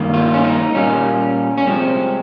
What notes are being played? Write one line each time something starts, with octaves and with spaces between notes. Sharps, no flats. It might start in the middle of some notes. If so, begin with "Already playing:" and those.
Already playing: G2 D#3 A#3
F4
C#4
D#4
A#2 G3 A#3 C#4
C#4
C2 C3 F3 G#3 C4